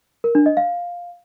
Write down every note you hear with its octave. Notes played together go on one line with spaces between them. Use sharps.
A#4
D4
D#5
F5